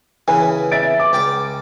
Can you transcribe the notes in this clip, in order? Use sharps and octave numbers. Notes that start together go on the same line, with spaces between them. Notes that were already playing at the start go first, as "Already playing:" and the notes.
C#3 E3 B4 G#5
E5 A6 D7
D6
C#2 D5 G5